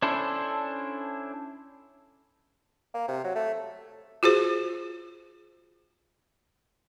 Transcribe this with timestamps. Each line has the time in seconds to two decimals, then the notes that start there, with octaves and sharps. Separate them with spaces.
0.02 C#4 D4 E4 A4 C5
2.94 A#3
3.08 C3
3.24 F#3
3.35 A3
4.23 F4 F#4 G#4 C5